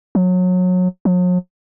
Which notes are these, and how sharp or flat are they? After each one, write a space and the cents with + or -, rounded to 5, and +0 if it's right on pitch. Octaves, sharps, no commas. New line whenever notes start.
F#3 -25
F#3 -45